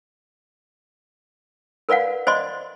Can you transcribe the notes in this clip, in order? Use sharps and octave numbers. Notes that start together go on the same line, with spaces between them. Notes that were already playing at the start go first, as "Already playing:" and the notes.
A#4 B4 D5 F5 F#5
C5 D5 D#5 C6